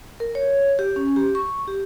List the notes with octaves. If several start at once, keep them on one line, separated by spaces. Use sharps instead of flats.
A#4
C#5
G4
C#4
G4
C#6
G4